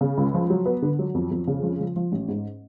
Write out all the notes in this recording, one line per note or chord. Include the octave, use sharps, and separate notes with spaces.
C#3
C#2
F3
F#3
B3
D3
F#3
F2
F2
C#3
F3
F3
F3
A1
G#2